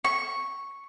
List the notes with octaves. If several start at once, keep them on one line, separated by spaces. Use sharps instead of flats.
C#6